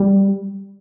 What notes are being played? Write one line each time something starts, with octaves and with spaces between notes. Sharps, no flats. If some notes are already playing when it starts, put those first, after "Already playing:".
Already playing: G3